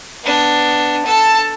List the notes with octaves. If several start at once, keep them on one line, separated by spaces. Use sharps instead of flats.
B3 D4
A4 A5